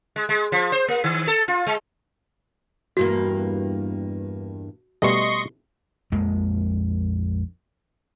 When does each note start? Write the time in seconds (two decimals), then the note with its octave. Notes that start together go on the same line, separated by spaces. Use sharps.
0.16 G#3
0.29 G#3
0.52 F3
0.72 C5
0.88 A#3
1.04 D#3
1.27 A4
1.48 F4
1.67 G#3
2.97 E2 G2 A#3 F#4
5.02 B2 G3 A3 D#5 C6 C#6
6.12 A#1 F2 G#3 A#3